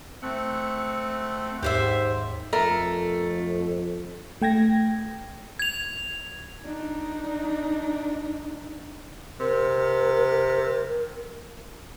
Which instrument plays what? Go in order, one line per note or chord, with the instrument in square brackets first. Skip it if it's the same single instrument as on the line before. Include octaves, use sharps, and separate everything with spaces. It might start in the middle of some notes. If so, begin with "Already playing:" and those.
[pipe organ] A3 F#5 [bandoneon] C4
[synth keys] D#2 G#2 [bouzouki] G4 C5 E5
[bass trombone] F2 [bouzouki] A3 [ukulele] A#4
[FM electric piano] A3 G5 G#6 A#6
[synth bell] G#6 F7
[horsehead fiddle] D4 D#4
[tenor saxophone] C3 [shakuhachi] A#4